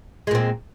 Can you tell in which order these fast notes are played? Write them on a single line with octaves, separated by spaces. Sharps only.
G#3 A#2 C4